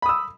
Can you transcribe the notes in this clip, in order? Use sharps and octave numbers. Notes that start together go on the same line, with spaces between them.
B5 D#6 E6